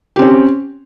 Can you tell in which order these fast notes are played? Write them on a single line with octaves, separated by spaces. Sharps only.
G4 C4 C#4